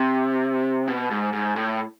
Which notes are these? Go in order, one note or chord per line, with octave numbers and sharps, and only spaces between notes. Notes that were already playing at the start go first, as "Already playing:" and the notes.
Already playing: C3
B2
G#2
G#2
A2